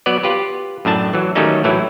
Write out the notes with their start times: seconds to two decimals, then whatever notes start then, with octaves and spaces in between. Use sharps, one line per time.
0.06 F#3 B3 B4 D5
0.23 F4 G4 B4
0.85 F#2 A2 D4 A5
1.13 E3 F#3
1.35 D#3 F#3 G3 A3 C#4 D#4
1.64 A2 E3 F#3 E4